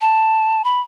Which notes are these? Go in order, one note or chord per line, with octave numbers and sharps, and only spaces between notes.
A5
B5